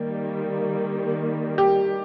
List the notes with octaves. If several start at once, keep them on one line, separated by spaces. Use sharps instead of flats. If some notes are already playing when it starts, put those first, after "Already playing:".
Already playing: D#3 G3 A#3
G4